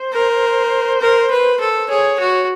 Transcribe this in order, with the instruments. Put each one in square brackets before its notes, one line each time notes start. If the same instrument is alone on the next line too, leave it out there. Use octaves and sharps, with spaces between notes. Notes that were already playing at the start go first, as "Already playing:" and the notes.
Already playing: [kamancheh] C5
[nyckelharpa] A#4
A#4
B4
A4
[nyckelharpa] G#4 [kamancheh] C#5
[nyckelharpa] F#4